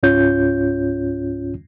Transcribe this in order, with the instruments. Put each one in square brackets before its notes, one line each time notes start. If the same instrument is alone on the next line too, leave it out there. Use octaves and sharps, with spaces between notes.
[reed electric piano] C#2 G#2 C#4 F4 C#5 G6